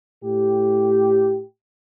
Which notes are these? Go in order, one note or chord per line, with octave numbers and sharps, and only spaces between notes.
A2 G4